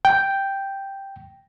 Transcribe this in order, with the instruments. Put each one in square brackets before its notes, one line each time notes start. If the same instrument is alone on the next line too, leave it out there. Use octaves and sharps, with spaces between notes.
[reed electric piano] G5